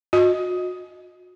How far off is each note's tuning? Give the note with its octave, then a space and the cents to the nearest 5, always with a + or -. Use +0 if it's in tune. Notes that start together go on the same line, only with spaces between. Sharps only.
F#4 -35 D#5 +0